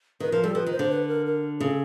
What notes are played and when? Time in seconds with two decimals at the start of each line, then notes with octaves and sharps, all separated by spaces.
0.20 D#3 B4
0.32 F3 A#4
0.43 G3 A4
0.55 F3 B4
0.66 D#3
0.72 C5
0.79 D3
0.91 B4
1.08 A#4
1.26 A#4
1.60 C#3 A4